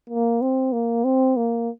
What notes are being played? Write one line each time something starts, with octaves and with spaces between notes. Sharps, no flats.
A#3
C4
A#3
C4
A#3